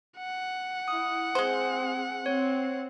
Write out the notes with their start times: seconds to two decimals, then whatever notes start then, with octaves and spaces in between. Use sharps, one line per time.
0.18 F#5
0.88 E4 D#6
1.35 G#3 C4 G#4 C5
2.26 C4 C#5